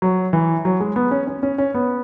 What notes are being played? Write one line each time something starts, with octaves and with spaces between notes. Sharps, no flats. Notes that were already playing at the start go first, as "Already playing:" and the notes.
F#3
E3
F#3
G#3
B3
C#4
C#4
C#4
C#4
B3